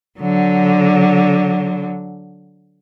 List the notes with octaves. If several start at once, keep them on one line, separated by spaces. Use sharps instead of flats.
D3 F#3